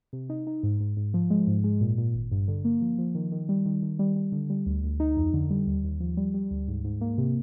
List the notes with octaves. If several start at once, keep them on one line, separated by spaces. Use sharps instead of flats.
C3
D#4
D#4
G#2
G#2
G#2
F3
G#3
G#2
G#3
A#2
A#2
G#1
G2
D3
A#3
F3
F3
D#3
D#3
G3
D#3
D#3
G3
G3
D3
G3
D2
D2
D#4
F2
D3
G3
D#2
D#2
F3
G3
G3
D2
G#2
G#2
A#3
C3